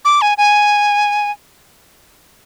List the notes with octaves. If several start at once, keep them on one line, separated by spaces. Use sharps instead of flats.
D6
G#5
G#5